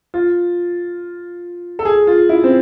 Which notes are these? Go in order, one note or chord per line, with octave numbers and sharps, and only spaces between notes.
F4
A4
G#4
F4
E4
C4